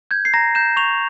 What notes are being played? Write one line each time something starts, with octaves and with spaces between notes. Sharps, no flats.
G6 G#6
C7
A#5 A#6
G6 E7
C#6 F7